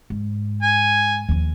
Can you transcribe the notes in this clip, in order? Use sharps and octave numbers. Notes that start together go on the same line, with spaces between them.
G#2
G#5
D#2 F3